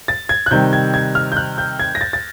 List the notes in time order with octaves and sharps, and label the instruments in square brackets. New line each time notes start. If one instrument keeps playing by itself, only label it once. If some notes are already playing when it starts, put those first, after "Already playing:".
[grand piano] A6
G#6
F#6
C3 D#3 G3 G6
G#6
G#6
F6
G6
F#6
G6
G#6
A#6
A6
A6